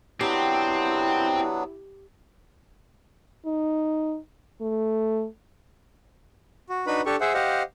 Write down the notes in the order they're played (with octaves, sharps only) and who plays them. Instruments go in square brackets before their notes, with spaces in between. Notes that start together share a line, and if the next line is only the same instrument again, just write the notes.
[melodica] F#3 B3 D4 [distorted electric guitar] C4 [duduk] E4 [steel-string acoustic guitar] G4
[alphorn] D#4
A3
[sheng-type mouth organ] F#4
D4 D#4 F#4 B4 B5
D4 G4 A4 C#6
G#4 C5 E5 F#5
G4 C5 D#5 F5 F#5